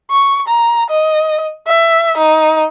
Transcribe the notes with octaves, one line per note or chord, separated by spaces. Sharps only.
C#6
A#5
D#5
E5
D#4